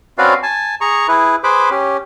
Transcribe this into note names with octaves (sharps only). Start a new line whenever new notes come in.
C4 C#4 F#4 B4 D5 F5
G#5 A5
G#4 A#5 C#6
E4 G#4 B4
G#4 B4 C5 B5 D6
C#4 G4